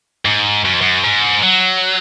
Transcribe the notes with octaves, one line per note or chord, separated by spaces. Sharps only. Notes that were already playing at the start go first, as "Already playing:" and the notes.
G#2
F#2
F2
F#2
G#2
F#3